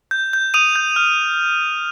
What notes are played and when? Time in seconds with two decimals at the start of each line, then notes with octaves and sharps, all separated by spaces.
0.11 G6
0.33 G6
0.54 D#6 D#7 F7
0.76 G6
0.96 F6